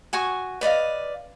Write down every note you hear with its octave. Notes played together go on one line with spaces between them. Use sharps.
F#4 G#5 C#6 D#6
B4 D5 D#5 F5